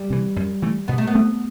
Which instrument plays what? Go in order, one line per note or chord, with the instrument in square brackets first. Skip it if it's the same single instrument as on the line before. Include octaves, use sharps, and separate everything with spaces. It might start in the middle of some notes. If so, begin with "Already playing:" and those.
Already playing: [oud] G3
[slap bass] C3 E3
F#2
E3 A3
[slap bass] B2 [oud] B3
[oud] A3
B3
[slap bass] A3 C4